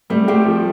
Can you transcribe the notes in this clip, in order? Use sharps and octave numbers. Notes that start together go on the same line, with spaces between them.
G3 A3 C4
A3 C4 G4
F3